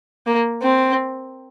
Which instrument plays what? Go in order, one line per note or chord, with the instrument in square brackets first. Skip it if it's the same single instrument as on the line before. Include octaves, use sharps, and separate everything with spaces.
[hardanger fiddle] A#3
C4